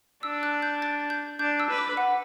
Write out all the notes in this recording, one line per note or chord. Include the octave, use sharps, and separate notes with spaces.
D4 E6
F#6
G6
A6
G6
D4 G6
E6
B4
D6
F#5